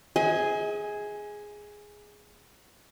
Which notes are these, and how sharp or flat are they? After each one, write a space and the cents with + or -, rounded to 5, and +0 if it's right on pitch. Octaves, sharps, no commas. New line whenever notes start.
G#4 +0 D#5 +45 G#5 +0